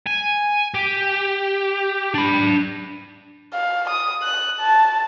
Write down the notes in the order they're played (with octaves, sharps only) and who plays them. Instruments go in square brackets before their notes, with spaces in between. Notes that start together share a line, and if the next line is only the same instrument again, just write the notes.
[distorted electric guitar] G#5
G4
D4 B5
[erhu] F5
D#6
F#6
A5